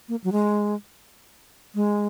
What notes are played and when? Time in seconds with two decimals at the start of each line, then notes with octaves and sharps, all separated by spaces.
0.09 A#3
0.24 F#3
0.32 G#3
1.75 G#3